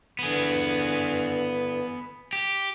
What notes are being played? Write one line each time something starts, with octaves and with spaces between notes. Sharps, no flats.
G2 D3 E3 B3 G#4
G4